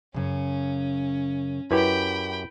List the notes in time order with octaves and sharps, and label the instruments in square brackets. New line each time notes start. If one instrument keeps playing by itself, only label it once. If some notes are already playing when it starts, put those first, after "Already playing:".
[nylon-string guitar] F#2 C#3 [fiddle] C#4
[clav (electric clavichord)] F#2 G4 [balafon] E4 B4 [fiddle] G5 B5